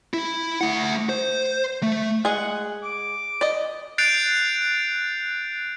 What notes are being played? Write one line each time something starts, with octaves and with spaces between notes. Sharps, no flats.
E4
A3 F#5
C5
A3
G#3 G#4 F#5
D6
D5 D#5
F#6 G6 A6 C7 D7 F7